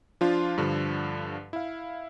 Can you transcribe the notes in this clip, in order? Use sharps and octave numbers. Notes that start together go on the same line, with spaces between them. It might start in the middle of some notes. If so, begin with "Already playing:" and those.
F3 D4 F4
G2 D3 F3
E4 F5